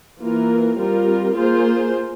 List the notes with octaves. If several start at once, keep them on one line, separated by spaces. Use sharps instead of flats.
E3 A#3 F4 A#4
G3 C4 F4 A#4
A#3 F4 G#4 C5